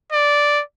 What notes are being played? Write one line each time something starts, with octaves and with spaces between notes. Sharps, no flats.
D5